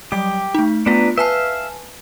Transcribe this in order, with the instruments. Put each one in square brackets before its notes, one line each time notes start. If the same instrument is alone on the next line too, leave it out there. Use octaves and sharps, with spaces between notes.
[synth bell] F#3 G3 D6 [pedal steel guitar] G4
[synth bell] A3 D#4
[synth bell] A3 B3 F4 [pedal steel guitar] D4 B4 A#5
[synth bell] B4 G#5 A5 [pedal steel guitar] E5 F5